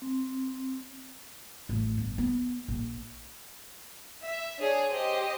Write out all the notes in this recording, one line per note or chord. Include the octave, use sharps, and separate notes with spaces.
C4
A1
G1
B3
A#1
E5
D4 G#4 C#5
G4 C5 D#5